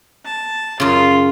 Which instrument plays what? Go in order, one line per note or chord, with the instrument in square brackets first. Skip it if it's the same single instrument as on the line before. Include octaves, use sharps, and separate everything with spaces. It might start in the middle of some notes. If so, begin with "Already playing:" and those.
[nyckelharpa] A5
[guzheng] F#2 C#3 [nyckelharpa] F4